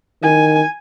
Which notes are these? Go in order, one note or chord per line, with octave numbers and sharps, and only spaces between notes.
D#3 G#5